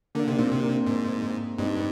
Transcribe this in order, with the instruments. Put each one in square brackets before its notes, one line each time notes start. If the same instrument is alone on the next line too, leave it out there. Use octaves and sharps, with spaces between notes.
[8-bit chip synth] D3 [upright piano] A#3 D4
[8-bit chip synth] C3 [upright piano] D4
[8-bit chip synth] A#2 [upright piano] C4
[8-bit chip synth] C3
[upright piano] A#3 D4
[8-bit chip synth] G#2
[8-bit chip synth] G2 [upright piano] C4 D#4